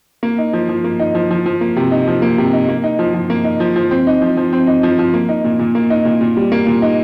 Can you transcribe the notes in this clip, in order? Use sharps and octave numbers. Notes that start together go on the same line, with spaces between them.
A#3
D#4
F3
F3
A#3
D#4
F3
F3
F3
A#3
C3
D#4
F3
A#3
C3
D#4
A#3
D#4
F3
F3
A#3
D#4
F3
F3
C4
D#4
F3
F3
C4
D#4
F3
F3
A#3
D#4
A#2
A#2
A#3
D#4
A#2
A#2
G3
A#3
A#2
D#4